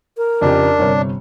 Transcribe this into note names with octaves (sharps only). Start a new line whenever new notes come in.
A#4
F2 C#3 D4 G4
G1 C3 C#5